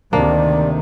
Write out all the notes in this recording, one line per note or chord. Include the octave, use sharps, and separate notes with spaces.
D2 C3 D#3 A#3 D4 D5